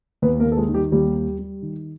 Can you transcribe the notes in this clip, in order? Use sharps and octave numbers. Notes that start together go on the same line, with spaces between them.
D#2 B3 B4
A#3 A#4
D#2
A4
G#3 G#4
D#3
G3 G4
D#2 G3 G4
G3
G3
D#3